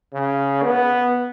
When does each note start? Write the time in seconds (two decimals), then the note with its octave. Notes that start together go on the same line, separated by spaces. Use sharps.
0.14 C#3
0.63 B3